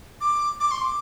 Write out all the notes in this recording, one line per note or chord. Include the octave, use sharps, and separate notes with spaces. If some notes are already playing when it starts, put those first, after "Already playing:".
D6
D6
C6
D6